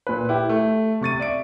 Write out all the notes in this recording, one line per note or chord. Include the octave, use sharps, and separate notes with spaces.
A#2 B4
E4 G4
A3
C3 C#6 A6 D#7
D5 E5 D7